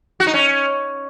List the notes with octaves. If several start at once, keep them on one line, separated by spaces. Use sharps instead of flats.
F#4
D#4
C#4